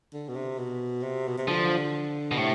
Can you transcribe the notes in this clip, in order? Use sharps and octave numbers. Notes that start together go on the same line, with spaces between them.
D3
B2
C3
B2
C3
B2
C3
D3 F3
B2
A2 C3